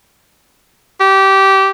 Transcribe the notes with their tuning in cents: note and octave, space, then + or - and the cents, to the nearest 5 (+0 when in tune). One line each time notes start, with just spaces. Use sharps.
G4 -20